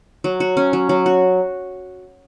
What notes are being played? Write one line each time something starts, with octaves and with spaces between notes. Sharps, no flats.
F#3
F#4
C#4
F#3
F#3
F#4